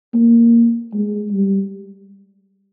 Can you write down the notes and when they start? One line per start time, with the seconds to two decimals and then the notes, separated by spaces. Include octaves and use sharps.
0.14 A#3
0.93 G#3
1.33 G3